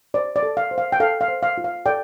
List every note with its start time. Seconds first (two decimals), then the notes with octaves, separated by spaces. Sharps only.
0.14 C5 D5
0.36 D5
0.43 A4
0.57 F5
0.71 C5
0.78 F5
0.92 G5
1.00 A4 F5
1.21 F5
1.28 C5
1.43 F5
1.58 F4
1.64 F5
1.86 A4 D5 G5